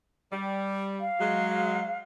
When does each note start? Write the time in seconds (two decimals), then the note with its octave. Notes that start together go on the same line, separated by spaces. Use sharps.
0.32 G3
1.00 F5
1.19 F#3 G#3